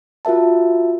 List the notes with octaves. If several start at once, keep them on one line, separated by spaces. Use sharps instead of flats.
F4 F#4 A#4 E5 A5